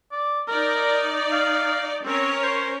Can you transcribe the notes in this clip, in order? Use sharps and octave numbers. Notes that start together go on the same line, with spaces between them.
D5
D#4 A#4 D5
F5
C4 C#4 A#4 C#5
C5